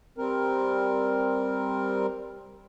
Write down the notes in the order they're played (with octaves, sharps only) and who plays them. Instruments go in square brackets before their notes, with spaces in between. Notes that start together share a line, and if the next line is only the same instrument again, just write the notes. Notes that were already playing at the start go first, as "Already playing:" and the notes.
[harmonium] G3 C4 A#4